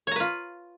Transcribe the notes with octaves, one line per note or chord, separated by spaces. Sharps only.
F4 B4 C#5 A#5